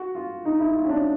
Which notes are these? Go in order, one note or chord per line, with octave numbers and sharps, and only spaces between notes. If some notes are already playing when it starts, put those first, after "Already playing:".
Already playing: F#4
F4
D#4
E4
F4
C#4
D4